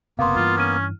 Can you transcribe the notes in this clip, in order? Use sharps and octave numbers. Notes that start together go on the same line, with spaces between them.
F#1 C3 A#3 B3 F5 C6
G2 E3 F4
C#4 F6 D#7